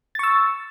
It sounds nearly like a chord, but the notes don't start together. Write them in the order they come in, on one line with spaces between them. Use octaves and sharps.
A6 C#6 E6